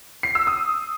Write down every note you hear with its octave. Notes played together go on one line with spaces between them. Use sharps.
C7
E6
D#6